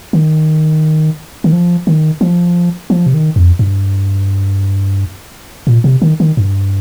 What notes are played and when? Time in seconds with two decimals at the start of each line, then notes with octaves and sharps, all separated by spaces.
0.13 D#3
1.44 D#3
1.52 F3
1.87 D#3
2.21 F3
2.90 F3
3.06 C3
3.14 D#3
3.36 F2
3.59 G2
5.67 A#2
5.84 C3
6.02 D#3
6.20 D#3
6.37 G2